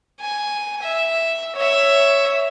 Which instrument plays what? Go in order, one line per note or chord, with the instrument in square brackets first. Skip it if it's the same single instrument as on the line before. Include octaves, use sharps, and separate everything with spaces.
[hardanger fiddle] G#5
E5
C#5 E5